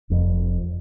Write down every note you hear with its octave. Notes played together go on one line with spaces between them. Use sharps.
F1 F2